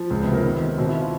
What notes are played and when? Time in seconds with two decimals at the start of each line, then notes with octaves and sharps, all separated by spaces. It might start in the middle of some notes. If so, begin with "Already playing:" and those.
Already playing: F3
0.10 C#2
0.22 B3
0.27 C3
0.33 A#3
0.44 D#3 B3
0.61 D#3
0.78 B2 C4
0.89 E4
1.01 F4